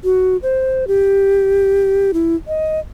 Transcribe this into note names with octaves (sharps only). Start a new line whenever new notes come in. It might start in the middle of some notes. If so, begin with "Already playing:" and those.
F#4
C5
G4
E4
D#5